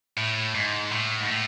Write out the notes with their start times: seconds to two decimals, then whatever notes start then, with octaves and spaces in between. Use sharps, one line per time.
0.17 A2
0.55 G#2
0.91 A2
1.21 G#2
1.29 A2